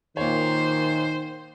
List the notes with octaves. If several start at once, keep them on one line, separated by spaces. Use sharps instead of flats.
A#2 D#3 C5 C#5